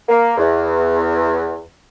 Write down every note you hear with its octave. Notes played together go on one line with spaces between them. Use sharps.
A#3
E2